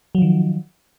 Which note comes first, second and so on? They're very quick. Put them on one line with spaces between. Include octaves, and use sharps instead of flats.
F#3 F3 D#3